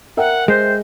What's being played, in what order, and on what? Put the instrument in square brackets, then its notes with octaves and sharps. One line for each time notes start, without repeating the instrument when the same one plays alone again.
[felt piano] A#4 E5 G5 [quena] F#5
[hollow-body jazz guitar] G#3 [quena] C5